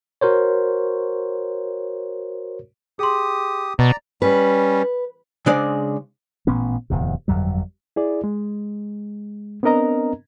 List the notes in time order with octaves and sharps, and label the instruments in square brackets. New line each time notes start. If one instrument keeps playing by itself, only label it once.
[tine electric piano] F#4 A#4 C5 C#5
[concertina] G4 D#6 [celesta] G#4 C6
[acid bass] B2 [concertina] D5 A#5
[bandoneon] G3 C#4 [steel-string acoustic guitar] B4
[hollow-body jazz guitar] C#3 G#3 D4 C5 D5
[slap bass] A1 A#2 B3 C#4
D1 E2 C3
G1 F2 F#3 G3
[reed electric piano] E4 G#4 D5
G#3
B3 C4 D4 A#4 D#5 A#5